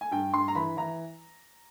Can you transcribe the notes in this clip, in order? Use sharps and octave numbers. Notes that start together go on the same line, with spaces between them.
G#5
G2 G5
G2 C6
A#5
E3 B5
E3 A#5